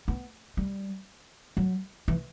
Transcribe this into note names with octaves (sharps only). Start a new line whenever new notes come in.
B3
G3
F#3
E3